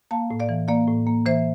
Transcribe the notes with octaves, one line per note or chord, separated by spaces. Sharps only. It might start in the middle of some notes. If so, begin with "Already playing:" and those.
A#3 F5 A5
A2
D5 F5
E3
A#3 D5 F5
A2
A#3
E3 C5 E5